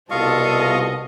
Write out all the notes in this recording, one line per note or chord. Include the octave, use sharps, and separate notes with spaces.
C2 B2 C4 F4 A4 D#5 F5 C#6